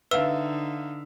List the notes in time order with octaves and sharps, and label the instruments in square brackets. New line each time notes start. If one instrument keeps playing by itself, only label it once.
[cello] D3 D#4 [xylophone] B4 E6 [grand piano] E5 F5